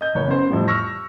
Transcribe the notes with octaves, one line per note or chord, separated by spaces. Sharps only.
D#5 G6
F#1 B4 C#5
B3 C#4 C5
F2 A2 G3
C#6 E6 F6 A#6